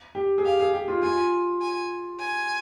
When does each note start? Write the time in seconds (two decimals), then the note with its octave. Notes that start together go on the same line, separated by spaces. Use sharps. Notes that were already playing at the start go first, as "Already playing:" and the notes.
0.15 G4
0.38 G#4
0.45 G4 F5
0.60 G#4
0.73 G4
0.88 F4
1.03 F4 G#5
1.62 G#5
2.20 G#5